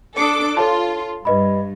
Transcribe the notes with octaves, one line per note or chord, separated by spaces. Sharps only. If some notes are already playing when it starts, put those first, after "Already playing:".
D4 A4 D6 D#6 C7 C#7
F4 A4 C#5 A5
G2 B4 D#5 B5